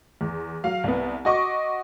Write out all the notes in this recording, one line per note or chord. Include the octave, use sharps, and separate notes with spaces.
E2
F#3 F5
C2 B3
F#4 D#5 C#6 D6